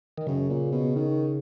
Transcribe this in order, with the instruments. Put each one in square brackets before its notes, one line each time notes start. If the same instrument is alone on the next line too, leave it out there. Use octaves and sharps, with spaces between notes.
[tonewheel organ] D#3
[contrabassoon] F#2 [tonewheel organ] C#3
[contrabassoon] A#2
B2
D#3